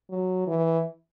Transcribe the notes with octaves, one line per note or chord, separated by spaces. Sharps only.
F#3
E3